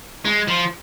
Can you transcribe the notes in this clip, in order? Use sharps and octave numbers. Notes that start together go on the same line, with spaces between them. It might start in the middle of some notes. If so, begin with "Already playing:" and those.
G#3
F3